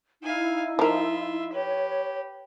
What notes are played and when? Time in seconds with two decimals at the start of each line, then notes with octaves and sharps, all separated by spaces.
0.23 D#4 E4 F5 G#5
0.79 F3 F4 A#4 E5
1.53 G4 B4 C#5